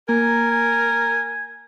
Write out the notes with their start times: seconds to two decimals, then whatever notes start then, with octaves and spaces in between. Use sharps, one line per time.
0.09 A#3 A#4 G#5
0.51 G#5